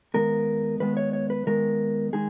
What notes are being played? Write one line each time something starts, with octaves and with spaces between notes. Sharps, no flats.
D#2 D#3 G#3 B3 A#4
D#2 D#3 G#3 B3 B4
C#5
C#5
B4
D#2 D#3 G#3 B3 A#4
D#3 G#3 G#4